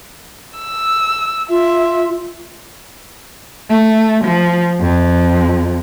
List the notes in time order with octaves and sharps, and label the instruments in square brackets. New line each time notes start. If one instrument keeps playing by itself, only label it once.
[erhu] E6
[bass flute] F4 [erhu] E5
[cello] A3
F3
F2